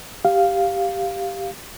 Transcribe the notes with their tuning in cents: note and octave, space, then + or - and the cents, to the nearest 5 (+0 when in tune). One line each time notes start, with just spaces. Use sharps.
G4 +0 F5 +0